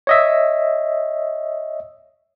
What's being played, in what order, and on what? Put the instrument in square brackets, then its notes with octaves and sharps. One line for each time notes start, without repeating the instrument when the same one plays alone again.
[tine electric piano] C#5 D#5 E5